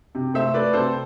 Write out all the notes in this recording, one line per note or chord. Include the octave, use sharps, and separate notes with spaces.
C3
A3 C5 E5
A3 B4 D5
C3 A4 C5